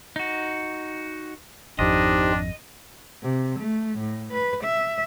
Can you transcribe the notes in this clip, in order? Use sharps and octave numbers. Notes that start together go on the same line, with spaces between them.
D#4 F#4
G#1 F2 D4 D#4 G4 C5 D#5
C3
A3
A2
B4
E5